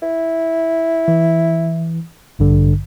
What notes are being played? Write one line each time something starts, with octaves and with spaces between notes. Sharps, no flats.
E4
E3
A1 G2 D3